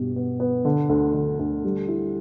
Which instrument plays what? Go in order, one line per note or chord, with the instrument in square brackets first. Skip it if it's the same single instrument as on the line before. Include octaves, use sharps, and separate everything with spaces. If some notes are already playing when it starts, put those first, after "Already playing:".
Already playing: [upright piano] G2 B2 G4
B3
B3
D3
D2
D3
D2
G3
E4